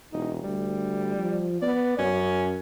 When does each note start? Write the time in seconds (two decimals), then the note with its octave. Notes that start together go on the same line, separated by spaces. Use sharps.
0.13 E1 D#4
0.43 D2 G3
1.17 F3
1.62 B3 D5
1.99 F#2 C#4